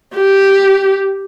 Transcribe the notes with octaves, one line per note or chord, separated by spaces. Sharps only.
G4